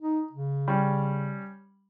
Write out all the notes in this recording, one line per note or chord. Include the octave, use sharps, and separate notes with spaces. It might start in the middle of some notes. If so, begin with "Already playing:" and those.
D#4
C#3
G3 C#4